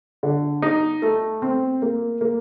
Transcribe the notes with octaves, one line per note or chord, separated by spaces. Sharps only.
D3
D#4
A3
C4
A#3
A#3